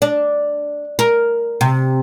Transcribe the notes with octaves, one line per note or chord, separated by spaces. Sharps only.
D4
A#4
C3